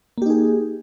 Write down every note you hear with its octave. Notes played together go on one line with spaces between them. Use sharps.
A#3 D#4 G4 G#4